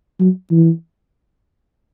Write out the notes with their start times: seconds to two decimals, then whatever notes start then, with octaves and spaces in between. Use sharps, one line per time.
0.20 F#3
0.51 E3